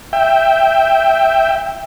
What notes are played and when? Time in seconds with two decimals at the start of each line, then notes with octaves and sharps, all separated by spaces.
0.13 E5 G5